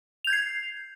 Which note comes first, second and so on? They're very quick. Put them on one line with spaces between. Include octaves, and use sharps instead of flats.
F7 G6 G#6 C7